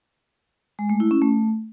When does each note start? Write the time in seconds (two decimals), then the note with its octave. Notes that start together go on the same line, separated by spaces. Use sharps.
0.79 G#3
0.89 A3
1.00 E4
1.11 C#4
1.22 A3